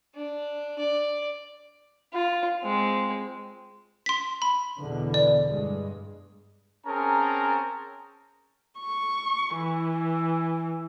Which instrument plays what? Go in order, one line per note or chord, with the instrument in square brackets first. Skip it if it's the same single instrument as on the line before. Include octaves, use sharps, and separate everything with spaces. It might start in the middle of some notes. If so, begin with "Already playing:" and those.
[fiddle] D4
D5
[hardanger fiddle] F4
G#3 C4
[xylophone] C6 B6
B5
[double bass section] E2 B2 D3
[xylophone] D5
[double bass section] G2 G#3
[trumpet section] C4 C#4 G#4 A#4 A5 A#5
[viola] C#6
E3